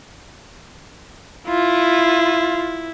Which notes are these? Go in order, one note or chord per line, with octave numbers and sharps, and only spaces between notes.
E4 F4